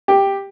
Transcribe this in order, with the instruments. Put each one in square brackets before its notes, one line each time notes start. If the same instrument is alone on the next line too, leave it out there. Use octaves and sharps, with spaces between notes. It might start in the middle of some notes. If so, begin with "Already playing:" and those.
[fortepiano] G4